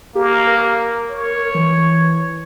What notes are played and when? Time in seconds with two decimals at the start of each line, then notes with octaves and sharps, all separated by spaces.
0.15 A#3 G4
0.47 A#4
1.10 C#5
1.55 E3